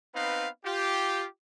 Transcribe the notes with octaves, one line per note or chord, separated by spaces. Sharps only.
B3 C4 D#4 B4 F5
F4 G4